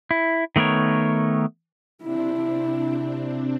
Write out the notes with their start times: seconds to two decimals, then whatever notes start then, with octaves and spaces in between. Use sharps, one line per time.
0.11 E4
0.56 D#3 A3 B3 A#4 C#5
2.03 C3 C4 D4 E4